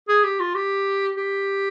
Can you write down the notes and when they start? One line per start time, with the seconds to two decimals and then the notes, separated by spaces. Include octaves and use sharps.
0.08 G#4
0.24 G4
0.40 F4
0.54 G4
1.17 G4